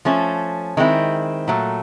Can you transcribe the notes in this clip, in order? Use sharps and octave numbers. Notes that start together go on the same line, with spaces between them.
F3 A3 C#4
D#3 G#3 C4 E4
A#2 F#3 A3